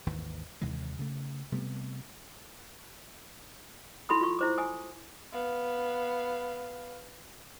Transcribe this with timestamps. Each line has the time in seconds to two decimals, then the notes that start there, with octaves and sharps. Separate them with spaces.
0.06 G#1 D#2 E3
0.61 D#2 C3 E3 G#3
0.99 C#3 A3
1.52 C3 G3 A3 B3
4.09 E4 A4 B5 C6 D#6
4.21 F4 C#6
4.39 E4 C5 D6
4.58 G#5 D#6
5.33 B3 F5